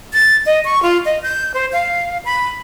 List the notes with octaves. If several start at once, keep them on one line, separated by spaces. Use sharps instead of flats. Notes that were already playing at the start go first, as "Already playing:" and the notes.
A6
D#5
C#6
F4
D#5
G6
C5
F5
B5